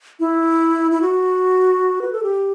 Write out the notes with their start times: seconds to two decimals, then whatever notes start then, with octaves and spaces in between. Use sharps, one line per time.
0.20 E4
0.91 E4
1.02 F#4
2.02 B4
2.12 A4
2.23 G4